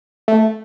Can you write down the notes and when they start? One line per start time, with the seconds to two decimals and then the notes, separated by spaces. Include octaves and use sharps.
0.28 A3